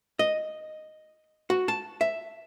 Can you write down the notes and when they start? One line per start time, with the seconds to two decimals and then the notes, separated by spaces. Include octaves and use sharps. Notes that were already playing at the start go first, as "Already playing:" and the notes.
0.19 D#5
1.50 F#4
1.68 A5
2.01 E5